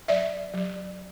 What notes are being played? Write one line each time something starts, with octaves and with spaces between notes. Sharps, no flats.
F#3 D5 E5
F#3